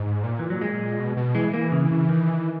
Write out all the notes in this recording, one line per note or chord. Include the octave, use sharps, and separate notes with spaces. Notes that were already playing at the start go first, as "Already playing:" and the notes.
Already playing: G#2
A#2
E3
F#3
G#3
B2
B2
E3 G#3
A#3
C#3
C#3
D#3